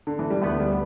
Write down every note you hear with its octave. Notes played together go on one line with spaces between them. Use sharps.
D3
E3
G3
D2 D3 A3 B3
G3